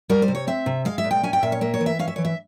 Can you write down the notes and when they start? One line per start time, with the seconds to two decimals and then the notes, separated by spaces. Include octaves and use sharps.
0.10 G3 A#4
0.22 C5
0.28 C3
0.35 C#5
0.47 C4 E5
0.66 C3
0.85 G#3 F5
0.98 E5
1.04 A#2
1.11 G5
1.23 C#4 G#5
1.33 G5
1.43 A#2 E5
1.52 C#5
1.61 A#3 E5
1.74 C#5
1.81 E3
1.86 E5
1.99 C#4 F5
2.08 E5
2.16 E3 C#5
2.25 E5